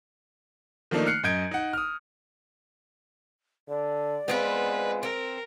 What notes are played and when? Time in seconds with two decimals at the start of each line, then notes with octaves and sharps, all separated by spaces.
0.91 D#3 F3 A3 A#3 D4 D#4
1.06 F6 F#6 C7 C#7
1.23 F#2 D#5 G6 G#6 D7
1.51 D#4 F#5
1.73 D#6 F6
3.69 D3 D5
4.28 G#3 B3 C4 F4 B4
5.03 C4 A#4